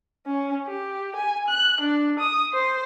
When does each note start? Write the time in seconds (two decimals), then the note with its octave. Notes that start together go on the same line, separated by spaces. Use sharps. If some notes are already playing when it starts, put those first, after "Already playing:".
0.26 C#4
0.68 G4
1.16 G#5
1.48 F#6
1.81 D4
2.19 D#6
2.53 C5